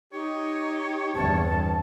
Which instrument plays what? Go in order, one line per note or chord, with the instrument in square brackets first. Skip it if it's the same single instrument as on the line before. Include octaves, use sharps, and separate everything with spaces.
[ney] D#4 [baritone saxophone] G4 [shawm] C#5
[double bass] G1 E2 [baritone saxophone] C4 [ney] A5